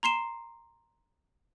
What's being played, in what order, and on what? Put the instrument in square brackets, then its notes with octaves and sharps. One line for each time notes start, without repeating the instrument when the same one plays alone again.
[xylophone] A#5 C6 C7 E7